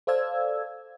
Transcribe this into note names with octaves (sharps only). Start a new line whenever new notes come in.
A4 C5 D5 F5 E6 G#6